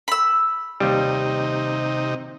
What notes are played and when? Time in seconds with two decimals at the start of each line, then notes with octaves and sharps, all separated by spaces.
0.08 B5 E6
0.80 D#2 C3 G3 D#4